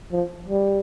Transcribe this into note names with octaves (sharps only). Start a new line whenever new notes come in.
F3
G3